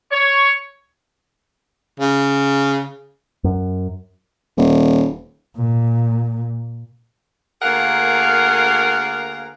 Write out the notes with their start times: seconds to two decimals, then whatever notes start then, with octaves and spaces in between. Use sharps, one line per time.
0.12 C#5
2.00 C#3
3.44 F#2
4.57 D#1
5.57 A#2
7.62 D2 A#3 G#4 A#4 F5 F#5